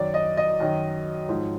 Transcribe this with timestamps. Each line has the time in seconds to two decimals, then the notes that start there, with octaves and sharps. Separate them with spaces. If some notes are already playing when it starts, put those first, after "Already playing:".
Already playing: F#2 D#3 D5
0.14 D#5
0.37 D#5
0.60 F#2 D#3
1.29 G#2 F3